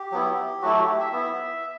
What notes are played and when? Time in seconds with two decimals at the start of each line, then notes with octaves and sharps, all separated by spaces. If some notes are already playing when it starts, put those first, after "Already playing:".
Already playing: G4
0.12 F#3 B3 E4
0.62 F#3 A3 E4 F#4
0.75 G4
0.88 G4
1.00 E5
1.12 B3 E4 E5